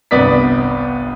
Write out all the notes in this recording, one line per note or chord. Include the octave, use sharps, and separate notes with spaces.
G1 C2 B3 D5 D#6 B6